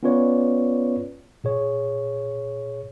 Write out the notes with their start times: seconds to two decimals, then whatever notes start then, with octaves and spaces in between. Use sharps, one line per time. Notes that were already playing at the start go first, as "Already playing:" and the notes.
0.03 B3 C#4 F4 B4 C#5 D5
1.44 A#2 G#4 C#5